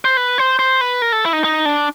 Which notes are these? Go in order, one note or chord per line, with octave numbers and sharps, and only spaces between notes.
C5
B4
C5
C5
B4
A#4
A4
E4
D#4
D#4
D4